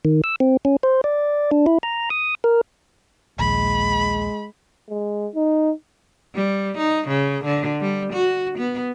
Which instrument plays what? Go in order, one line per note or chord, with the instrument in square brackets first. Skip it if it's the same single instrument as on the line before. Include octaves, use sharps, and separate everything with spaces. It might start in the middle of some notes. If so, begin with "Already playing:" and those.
[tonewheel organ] D#3
E6
C4
C#4
C5
D5
D4
E4
A#5
D#6
A#4
[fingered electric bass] A#1 D#2 [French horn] G#3 [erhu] B5
[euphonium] G#3
D#4
[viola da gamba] G3
D#4
C#3
D3
G3
F#4
B3